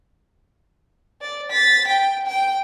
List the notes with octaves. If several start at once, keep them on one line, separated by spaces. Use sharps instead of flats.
D5
A6 B6
G5
G5